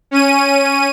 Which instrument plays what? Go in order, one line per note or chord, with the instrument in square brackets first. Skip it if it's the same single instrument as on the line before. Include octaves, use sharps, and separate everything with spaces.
[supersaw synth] C#4 D#7